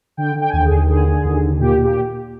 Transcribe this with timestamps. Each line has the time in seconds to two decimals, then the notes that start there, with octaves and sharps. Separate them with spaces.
0.17 D3 G5
0.36 D3
0.41 G5
0.49 G#5
0.53 D#2 G5
0.65 G#4
0.71 D#2
0.89 D3 G#4
1.07 D3
1.25 D#2
1.43 D#2
1.60 A#2 G4
1.78 A#2
1.84 G4